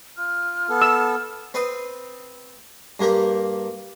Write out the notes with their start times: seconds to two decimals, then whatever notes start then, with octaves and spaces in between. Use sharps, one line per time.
0.18 F4 F6
0.69 B3 A4
0.82 E6
1.54 C4 B4 C6 D#6
3.00 G2 A#3 G4 A#4